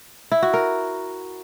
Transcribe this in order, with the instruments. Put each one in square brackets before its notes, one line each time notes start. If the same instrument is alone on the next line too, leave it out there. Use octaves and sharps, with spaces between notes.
[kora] E4
F#4
A#4